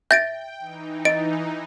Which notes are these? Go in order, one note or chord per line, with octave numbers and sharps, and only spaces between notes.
E5 G5 G6 A6 D7
E3 D#4
D#5 D7